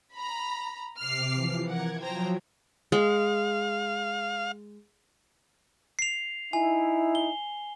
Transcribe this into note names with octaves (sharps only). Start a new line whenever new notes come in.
A#5 B5
C3 D6 F6 C7
E3 F3
A#4 F#5 G#6
F3 F#3 C5 G5 A#5
G#3 F5
C7 F7
D#4 E4 G#5
G7